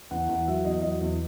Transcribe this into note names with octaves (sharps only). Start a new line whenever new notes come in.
E2 F#5
E2 F#5
F#3 E5
E2 D#5
F#3 D#5
E2